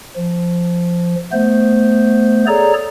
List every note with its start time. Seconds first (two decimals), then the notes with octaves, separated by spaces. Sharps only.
0.16 F3
1.32 A3 B3 C5
2.47 G#4 A4 C#5 D5 A#5